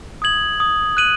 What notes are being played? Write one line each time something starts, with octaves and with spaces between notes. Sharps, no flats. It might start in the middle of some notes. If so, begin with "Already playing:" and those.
D#6 G#6 F#7
D#6
F#6 D#7 F#7